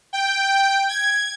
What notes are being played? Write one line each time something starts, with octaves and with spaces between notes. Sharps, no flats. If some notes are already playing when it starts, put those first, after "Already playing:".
G5
G#6